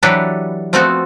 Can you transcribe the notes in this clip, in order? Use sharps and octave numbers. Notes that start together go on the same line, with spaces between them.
E3 F#3 D4 G4 A4 B4
F3 A3 B3 C4 F#4 A4